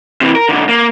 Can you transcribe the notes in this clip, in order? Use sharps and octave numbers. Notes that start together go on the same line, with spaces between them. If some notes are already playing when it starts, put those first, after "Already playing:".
C3 E3
A#4
B1 D3
A#3